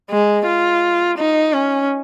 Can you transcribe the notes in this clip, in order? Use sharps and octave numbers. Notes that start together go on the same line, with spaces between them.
G#3
F4
D#4
C#4